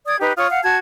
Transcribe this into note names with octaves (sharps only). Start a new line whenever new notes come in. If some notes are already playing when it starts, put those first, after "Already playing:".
D5 D#6 G#6
D#4 G4 B4
F4 C#5 C#6 D#6
F5 F#5
F#4 A5 G#6